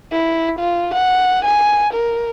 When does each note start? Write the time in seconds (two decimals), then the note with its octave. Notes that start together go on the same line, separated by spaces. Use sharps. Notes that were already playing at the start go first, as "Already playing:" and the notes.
0.12 E4
0.59 F4
0.94 F#5
1.45 G#5
1.93 A#4